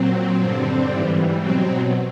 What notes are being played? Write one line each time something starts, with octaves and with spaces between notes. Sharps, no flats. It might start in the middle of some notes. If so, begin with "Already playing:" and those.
Already playing: A#2 F#3 C4
G2 D3 G3
G#2 E3 G3
B2 F#3 C4